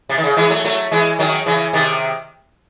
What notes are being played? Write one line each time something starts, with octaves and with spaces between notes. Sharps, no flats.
C3
D#3
C#3
E3 G#3
F#3 A3
F#3 A3
E3 G#3
D#3 F#3
C#3 E3
C3 D#3